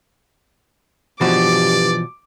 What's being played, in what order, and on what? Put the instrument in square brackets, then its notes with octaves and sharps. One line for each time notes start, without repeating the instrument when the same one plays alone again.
[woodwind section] G2 [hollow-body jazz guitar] B2 E3 F3 [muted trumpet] D5 [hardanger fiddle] D6